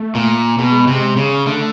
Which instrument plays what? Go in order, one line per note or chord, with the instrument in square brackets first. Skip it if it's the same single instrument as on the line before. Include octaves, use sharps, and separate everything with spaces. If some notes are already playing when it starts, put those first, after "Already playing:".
Already playing: [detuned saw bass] A3
[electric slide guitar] A#2
[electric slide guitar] B2 [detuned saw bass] G#3
[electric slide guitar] C3
C#3
[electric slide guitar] D3 [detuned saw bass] A3